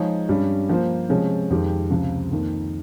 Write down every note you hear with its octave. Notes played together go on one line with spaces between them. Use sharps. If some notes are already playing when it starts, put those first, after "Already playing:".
Already playing: F3 G#3 D#4 G#4 C#5
G2 G3 C#4
F3 A#3 F4 C5
C3 F3 G#3 C#4
F2 D#3 G#3 C4 G4
C#2 C3 F3
F2 D#3 A#3